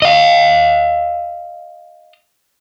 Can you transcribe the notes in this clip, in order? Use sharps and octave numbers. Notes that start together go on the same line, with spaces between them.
D#5 F5